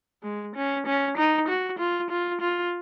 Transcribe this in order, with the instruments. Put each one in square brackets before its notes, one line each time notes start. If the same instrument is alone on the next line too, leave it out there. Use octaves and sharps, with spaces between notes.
[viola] G#3
C#4
C#4
D#4
F#4
F4
F4
F4